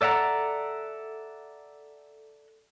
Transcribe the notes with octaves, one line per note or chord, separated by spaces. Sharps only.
A4 D5 E5 F#5 A#5